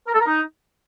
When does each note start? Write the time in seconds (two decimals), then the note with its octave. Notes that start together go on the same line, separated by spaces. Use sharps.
0.06 A#4
0.13 A4
0.20 A#4
0.26 D#4